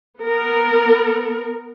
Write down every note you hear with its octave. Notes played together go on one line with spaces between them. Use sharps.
B3 A#4